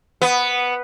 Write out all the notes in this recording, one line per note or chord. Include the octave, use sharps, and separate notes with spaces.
B3